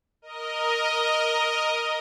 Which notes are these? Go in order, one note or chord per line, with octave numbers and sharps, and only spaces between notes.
A#4 D#5